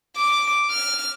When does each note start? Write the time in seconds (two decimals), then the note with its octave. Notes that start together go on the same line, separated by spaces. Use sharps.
0.17 D6
0.71 F6